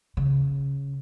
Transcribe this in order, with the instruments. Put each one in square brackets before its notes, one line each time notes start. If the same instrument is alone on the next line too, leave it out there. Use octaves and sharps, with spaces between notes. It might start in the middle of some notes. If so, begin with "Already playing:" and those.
[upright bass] C#3